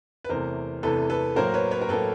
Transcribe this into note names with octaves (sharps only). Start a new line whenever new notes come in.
B4
E2 C3 E3 A3 A#4 C5
E2 C3 E3 A3 A4 B4
A4 B4
A2 F#3 A#3 A#4 C5
B4 C#5
B4 C#5
A#4
A2 F#3 A#3 A4 B4